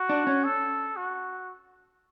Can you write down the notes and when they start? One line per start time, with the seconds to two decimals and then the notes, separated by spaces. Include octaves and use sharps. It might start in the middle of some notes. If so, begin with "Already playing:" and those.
Already playing: F#4
0.09 D4
0.27 C#4
0.44 A4
0.97 F#4